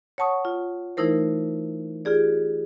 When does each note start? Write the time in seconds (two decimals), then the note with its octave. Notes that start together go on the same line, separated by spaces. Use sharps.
0.18 C#5 F#5 A5 C#6 D#6
0.45 F4
0.97 E3 A3 D#4 E4 A#4 C5
2.05 F4 G4 G#4 D5